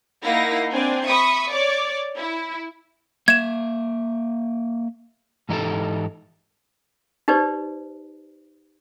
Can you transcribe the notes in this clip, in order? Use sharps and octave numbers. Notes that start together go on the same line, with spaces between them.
A#3 D#4 E4 F5 F#5 A#6
C4 D4 G#5
E5 B5 C#6 D#6
C#5 D5 D6
E4
A#3 E5 G#6 E7
G#2 E3 D#4 E4 G4 A4
D#4 G4 B4 C5 D5